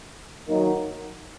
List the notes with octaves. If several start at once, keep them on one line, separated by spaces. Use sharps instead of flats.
D#3 F#3 A#3 D#4